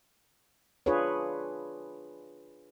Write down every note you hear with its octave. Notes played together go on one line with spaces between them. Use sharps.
D4 F4 G#4 B4 C#5